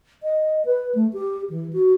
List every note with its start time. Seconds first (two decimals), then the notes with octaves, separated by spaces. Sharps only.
0.23 D#5
0.65 B4
0.95 A3
1.13 G4
1.50 E3
1.73 F#4